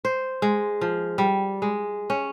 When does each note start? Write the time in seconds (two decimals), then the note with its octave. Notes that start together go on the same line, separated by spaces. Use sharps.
0.05 C5
0.42 G#3
0.81 F3
1.18 G3
1.62 G#3
2.10 C#4